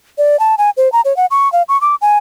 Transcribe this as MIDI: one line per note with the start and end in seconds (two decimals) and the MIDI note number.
0.18 0.39 74
0.39 0.55 81
0.58 0.70 80
0.77 0.91 72
0.92 1.01 82
1.05 1.16 73
1.17 1.26 78
1.31 1.51 85
1.52 1.63 77
1.69 1.79 85
1.81 1.95 86
2.01 2.18 80